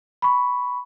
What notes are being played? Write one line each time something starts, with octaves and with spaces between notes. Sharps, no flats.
B5 C#6